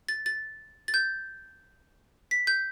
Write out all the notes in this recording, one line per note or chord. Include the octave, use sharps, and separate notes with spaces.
A6
A6
A6
G6
B6
G6